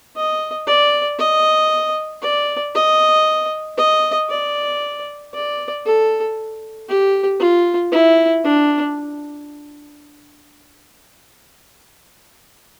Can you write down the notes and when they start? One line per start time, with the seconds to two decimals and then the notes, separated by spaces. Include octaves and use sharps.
0.16 D#5
0.67 D5
1.19 D#5
2.22 D5
2.75 D#5
3.77 D#5
4.29 D5
5.34 D5
5.86 A4
6.89 G4
7.40 F4
7.92 E4
8.44 D4